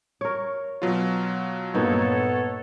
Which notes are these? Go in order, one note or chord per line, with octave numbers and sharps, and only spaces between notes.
A#4 C#5 C#6
B2 F#3 F4
G2 A#2 A#3 B3 D#4 A4 C#5